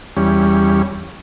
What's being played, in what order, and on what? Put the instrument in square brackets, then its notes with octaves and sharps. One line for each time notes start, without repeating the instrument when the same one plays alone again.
[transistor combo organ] E2 G3 C#4